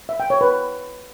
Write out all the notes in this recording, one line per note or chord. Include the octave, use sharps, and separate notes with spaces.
E5
G5
C#5
B4